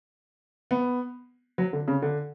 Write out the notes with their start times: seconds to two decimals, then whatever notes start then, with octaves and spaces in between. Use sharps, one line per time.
0.71 B3
1.58 F#3
1.73 D3
1.88 C#3
2.02 D3